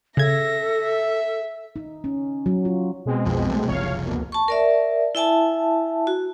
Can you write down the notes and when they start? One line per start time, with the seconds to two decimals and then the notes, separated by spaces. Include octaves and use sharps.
0.17 C#3 A4 E5 G#6 A#6
0.79 E5
1.76 D#4
2.04 C#4
2.46 F#3
2.65 F4
3.06 B2 G#3 C4
3.26 B1 F2 F3
3.49 C2 G3 A3
3.68 F#1 C2 F3 C#5 F5
4.05 D2 B2 A#3
4.32 A5 C#6
4.48 A#4 D5 E5
5.15 E4 E5 G#5 A5
6.07 F#4